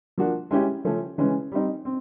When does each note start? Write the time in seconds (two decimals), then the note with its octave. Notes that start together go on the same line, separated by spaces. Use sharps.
0.18 F3 A#3 D4 F#4
0.51 G#3 C#4 E4 G4
0.85 C#3 F3 A3 C#4
1.18 C#3 E3 G#3 C#4
1.52 G3 C4 D#4
1.85 C4